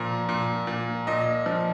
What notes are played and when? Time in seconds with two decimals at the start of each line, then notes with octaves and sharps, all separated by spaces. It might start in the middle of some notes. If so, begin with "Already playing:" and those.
Already playing: A#2 F3 A#5
0.29 A#2
0.67 A#2
1.07 A#2 D#5
1.46 F3